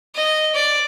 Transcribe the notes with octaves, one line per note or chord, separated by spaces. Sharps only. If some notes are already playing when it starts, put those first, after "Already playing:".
D#5
D5